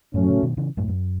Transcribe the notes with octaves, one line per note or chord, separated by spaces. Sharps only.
F#2 A2 F#3 A3 C#4
A2 C#3
B2 D#3
C#3 E3
F#2 A2
F#2